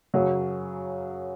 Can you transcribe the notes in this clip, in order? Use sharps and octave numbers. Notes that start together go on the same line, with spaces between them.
F#2 C#3 F#3